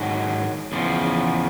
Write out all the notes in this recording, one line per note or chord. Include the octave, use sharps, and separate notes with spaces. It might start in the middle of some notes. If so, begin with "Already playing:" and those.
Already playing: G#2 D#3 F#3
E2 C#3 F3